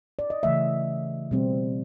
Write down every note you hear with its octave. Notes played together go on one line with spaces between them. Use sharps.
D5
D#5
C#3 E3 A3 E5
B2 G3 C4